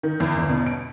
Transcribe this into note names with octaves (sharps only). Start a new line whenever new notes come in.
D#3
E2
G1
B2
D7